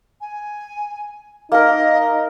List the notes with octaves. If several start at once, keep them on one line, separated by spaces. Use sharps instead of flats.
G#5
A#3 D#4 A#4 D#5